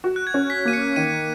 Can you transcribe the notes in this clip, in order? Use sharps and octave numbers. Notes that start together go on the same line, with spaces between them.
F#4
F#6
G#6
C#4
B6
A#3 D#7
C#7
D#3 D#7